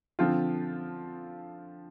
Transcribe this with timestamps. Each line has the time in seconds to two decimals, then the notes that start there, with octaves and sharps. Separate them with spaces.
0.19 D3 F3 C4 F4